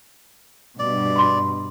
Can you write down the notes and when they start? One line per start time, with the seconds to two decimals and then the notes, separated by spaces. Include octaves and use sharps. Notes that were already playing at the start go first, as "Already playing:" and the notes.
0.79 G2 B2 D5
1.16 B5 C6